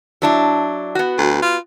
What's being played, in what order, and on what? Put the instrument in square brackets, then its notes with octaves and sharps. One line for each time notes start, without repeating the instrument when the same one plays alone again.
[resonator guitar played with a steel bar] F#3 D4 E4
B3 F#4
[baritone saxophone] D2
F4